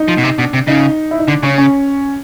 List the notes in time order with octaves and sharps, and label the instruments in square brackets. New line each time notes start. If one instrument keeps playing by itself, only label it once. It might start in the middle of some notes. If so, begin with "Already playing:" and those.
Already playing: [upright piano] D#4
[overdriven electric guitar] F3
B2
C3
[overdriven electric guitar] B2 [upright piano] D4
[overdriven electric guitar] C3
[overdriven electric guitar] C#3 [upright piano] D#4
[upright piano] E4
D#4
[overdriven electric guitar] D3 [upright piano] D4
[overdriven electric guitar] C#3 [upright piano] C#4
[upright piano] C#4